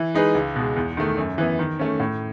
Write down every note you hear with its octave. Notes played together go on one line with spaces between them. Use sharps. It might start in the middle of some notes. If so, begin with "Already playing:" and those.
Already playing: E3
G#3 D#4 G#4 B4
C#2
B2 G#3
E2
D#3 A3
F#2
E3 B3
D#3
A3 C#4
A2